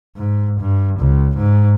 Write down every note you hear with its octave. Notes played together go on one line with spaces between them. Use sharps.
G#2
G2
C#2
G#2